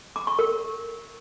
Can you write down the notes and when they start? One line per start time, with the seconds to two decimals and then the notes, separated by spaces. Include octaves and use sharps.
0.16 D6
0.27 C#6
0.39 A#4